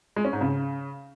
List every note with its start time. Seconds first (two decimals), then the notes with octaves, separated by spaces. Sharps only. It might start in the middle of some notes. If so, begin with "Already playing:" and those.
0.16 G#3
0.25 C#4
0.33 G#2
0.41 C#3